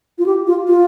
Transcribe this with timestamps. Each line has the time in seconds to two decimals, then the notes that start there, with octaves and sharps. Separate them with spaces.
0.19 F4
0.26 G4
0.47 F4
0.67 F4